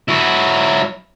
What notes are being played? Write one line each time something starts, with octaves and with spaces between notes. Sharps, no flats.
F#3 E4